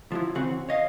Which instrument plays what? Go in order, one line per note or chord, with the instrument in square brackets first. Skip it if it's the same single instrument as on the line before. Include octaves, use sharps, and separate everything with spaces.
[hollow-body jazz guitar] F3 F#3 E4
C#3 E3 C4 F#4
C#5 D#5 F5